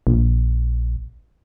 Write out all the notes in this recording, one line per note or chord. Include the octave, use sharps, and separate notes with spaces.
A#1